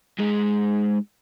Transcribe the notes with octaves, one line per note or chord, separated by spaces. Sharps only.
G#2 G#3